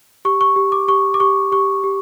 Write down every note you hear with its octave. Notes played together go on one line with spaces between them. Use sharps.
G4 C#6
C#6
G4
D6
G4 C#6
D6
G4 C#6
G4 C#6
G4